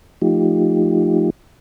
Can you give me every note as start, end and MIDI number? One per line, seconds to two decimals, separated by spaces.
0.22 1.30 53
0.22 1.30 57
0.22 1.30 63
0.22 1.30 65
0.22 1.30 67